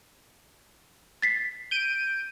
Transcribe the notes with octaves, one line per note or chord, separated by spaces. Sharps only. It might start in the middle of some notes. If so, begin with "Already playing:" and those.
A6 B6 C7
G6 D7 D#7